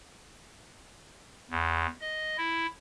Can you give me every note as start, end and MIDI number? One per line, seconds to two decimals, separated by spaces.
1.51 1.87 40
2.01 2.37 75
2.38 2.67 64